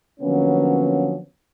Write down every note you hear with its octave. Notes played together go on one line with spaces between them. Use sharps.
D3 F3 F#3 A#3 B3 C#4